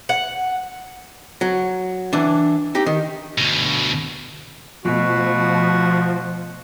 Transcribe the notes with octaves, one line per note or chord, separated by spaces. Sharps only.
F#5
F#3
E3 D4
D#4 G4
D#3
D2 B2
B2 F3 A3 F#4